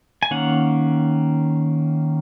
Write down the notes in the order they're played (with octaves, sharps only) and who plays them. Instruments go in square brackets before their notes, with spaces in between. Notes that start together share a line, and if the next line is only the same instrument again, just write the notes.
[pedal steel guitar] G#5
D#3 A#3 C#4 F#5